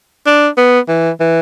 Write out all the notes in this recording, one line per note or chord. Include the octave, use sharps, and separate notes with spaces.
D4
B3
E3
E3